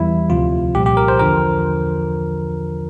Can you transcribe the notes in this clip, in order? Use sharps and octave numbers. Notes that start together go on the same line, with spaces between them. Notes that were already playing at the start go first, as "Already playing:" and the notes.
Already playing: E2 E3 G3 E4
D2 C3 F3 F4
C2 A#2 F3 G4
G4
A#4
C5
E2 D3 F3 A#4